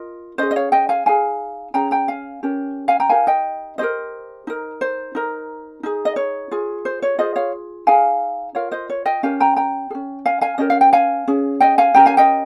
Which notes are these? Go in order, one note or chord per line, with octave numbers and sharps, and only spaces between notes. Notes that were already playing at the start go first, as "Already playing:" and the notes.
Already playing: F4 A#4 D#5
C#4 G#4 C5 D#5
D#5
C#5 F5
D#5 G5
F5 G#5
D#4 G#4 F5 G#5
C#4 G#4 G5 A#5
G5 A#5
F5 G#5
C#4 G4 A#4
F5 G#5
G5 A#5
D#4 G4 A#4 F5 G#5
D#5 G5
C#4 G4 A#4 C5 D#5
D#4 A#4
C5
D#4 A#4
D#4 G#4
D#5
C#5
F4 G#4
C5
C#5
F4 G#4 C5 D#5
C#5 F5
D#4 G#4 F5 G#5
F4 A#4 C#5 F5
C5 D#5
C#5
D#5 G5
C#4 G4 A#4 F5 G#5
G5 A#5
G5 A#5
G#4
C#4
F5 G#5
F5 G#5
C#4 G4 A#4 D#5
F5
G5
F5 G#5
C#4 G#4
D#5 G5
F5 G#5
C#4 G4 A#4 G5 A#5
F5 G#5
D#5 G5